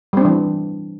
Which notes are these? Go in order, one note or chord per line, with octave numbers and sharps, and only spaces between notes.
E3 G3 C4 D4